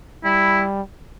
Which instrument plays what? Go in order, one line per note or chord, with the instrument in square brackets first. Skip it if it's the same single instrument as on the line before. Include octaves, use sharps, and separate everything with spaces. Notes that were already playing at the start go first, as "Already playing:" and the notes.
[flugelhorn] G3 [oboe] E4